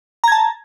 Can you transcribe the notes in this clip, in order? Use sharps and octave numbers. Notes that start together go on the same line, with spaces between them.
A5 A#5 G#6